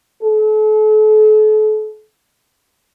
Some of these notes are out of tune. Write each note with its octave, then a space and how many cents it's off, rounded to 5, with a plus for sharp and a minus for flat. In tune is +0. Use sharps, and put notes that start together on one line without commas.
A4 -40